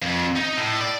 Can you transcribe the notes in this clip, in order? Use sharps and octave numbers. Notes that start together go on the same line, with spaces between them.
F2
D#4
A2
D5